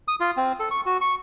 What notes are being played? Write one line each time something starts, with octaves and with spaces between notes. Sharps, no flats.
D#6
F4
C4
A4
C#6
F#4
C#6